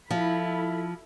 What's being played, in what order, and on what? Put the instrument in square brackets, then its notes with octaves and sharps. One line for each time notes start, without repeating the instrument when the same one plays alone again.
[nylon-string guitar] F3 [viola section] E4 A4 B5